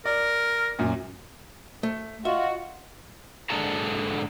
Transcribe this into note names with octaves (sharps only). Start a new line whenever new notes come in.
A#4 D5
F#2 A#2
A3
F4 F#4 D#5 E5
G#2 D3 G#4 A4 A5 A#5